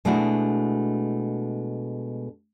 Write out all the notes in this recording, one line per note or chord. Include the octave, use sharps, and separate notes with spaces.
B2 G#3 A3 D4 E4 F#4